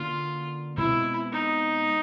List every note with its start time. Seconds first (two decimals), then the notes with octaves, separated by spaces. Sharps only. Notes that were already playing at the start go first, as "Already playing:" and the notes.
Already playing: D3 A#3 C#4 F4
0.77 B2 G#3 C4 E4
1.33 D#4